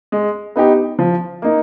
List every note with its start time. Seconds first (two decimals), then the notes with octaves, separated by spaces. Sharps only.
0.12 G#3
0.56 B3 D#4 G4
0.99 F3
1.42 A#3 D#4